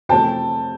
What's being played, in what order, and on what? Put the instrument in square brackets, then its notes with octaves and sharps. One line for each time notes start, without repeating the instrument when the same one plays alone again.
[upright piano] F2 C3 E3 A3 G5 A5